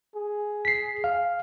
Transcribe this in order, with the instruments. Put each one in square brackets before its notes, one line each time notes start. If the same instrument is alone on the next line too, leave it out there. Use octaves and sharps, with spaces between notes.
[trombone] G#4
[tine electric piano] B6 C7
F5